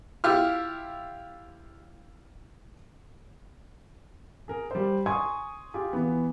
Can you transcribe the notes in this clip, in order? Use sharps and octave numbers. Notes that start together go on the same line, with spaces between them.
E4 F4 G4 F6
G#4 A#4
G3 A#4 C5
G#5 C6 C#6 D#6 G#6
F4 G4 G#4
E3 B3